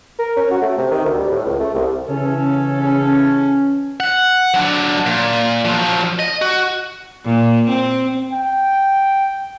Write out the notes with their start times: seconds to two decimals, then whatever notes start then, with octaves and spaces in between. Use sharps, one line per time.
0.19 A#4
0.37 C#4
0.51 F#4
0.62 A3
0.78 C3
0.91 D#3
1.05 D2
1.19 G3
1.31 A2
1.45 C#2
1.60 A3
1.75 C2
2.08 C#3 E3 C#4 A4
2.80 C#4
4.00 F#5
4.54 F#3 D4
5.06 A#2
5.65 F3 F#3
6.19 D#5
6.42 F#4
7.25 A#2
7.68 C4
8.33 G5